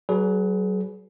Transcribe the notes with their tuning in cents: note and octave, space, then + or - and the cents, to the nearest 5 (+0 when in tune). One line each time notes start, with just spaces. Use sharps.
F#3 +35 G#4 +35 B4 +0